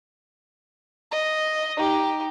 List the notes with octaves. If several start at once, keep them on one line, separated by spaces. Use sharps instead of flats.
D#5
D#4 G4